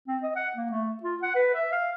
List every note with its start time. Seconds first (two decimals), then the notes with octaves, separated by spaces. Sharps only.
0.08 C4
0.23 D#5
0.36 F#5
0.56 A#3
0.70 A3
1.03 F4
1.22 F#5
1.35 B4
1.54 E5
1.72 F5